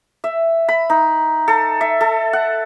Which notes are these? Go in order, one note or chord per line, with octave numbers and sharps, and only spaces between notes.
E5
B5
D#4
A4
E5
A4
F#5